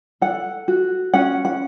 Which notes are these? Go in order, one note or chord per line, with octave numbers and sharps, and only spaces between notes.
A4 F#5
F#4
C#4 F#5
F#5